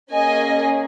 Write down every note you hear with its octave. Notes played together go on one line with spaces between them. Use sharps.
A#3 C#4 G#4 D#5 G#5